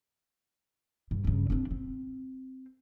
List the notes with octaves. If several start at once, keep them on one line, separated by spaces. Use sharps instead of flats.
G2
G2 C#3
C4 D4
C4